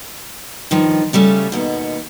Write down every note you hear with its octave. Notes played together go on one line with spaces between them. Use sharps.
G2 D#3 F3
C#3 G3 A3 C#4
D#2 B2 B3